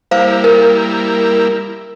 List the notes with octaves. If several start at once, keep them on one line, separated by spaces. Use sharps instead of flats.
G3 A#3 E4 C5 F5
A#4